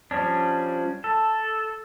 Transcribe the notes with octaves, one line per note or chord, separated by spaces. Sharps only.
F3 G3 C#4 D4
A4